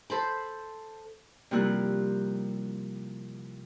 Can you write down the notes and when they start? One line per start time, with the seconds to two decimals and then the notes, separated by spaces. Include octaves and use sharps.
0.10 A4 C5 B5
1.51 C3 F3 G3 A#3 E4 F#6